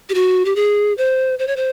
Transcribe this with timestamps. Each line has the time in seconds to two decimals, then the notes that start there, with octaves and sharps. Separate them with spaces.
0.10 G4
0.14 F#4
0.45 G4
0.56 G#4
0.98 C5
1.39 C5
1.47 C#5
1.56 C5